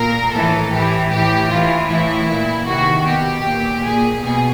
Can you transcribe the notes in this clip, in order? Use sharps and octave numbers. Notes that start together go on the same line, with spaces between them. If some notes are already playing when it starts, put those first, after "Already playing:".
Already playing: A#2 A#4
A2 E3 A4
A2 E3 G4
A2 E3 G4
A2 E3 F4
A2 E3 E4
A#2
C3 D#3 F#4
B2 G4
A#2
A#2 G#4
B2 G#4